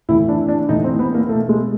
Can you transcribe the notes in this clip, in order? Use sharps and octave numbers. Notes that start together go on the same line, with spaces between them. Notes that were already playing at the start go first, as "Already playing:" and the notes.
A2 E3 E4
D4
D4
A2 E3 D#4
C4
B3
A#3
B2 A3
G#3